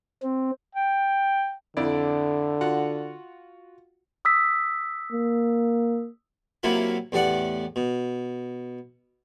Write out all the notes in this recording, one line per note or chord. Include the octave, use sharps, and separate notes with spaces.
C4
G5
F2 D3 E4 D5
F4 F#4 F#5
D#6 E6 B6
A#3
C3 F#3 A#3 E4 F4 B5
E2 A2 G4 D5 F#5 D6
B2